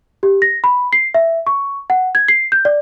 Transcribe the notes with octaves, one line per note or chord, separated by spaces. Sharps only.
G4
A#6
B5
C7
E5
C#6
F#5
G#6
C7
G6
D5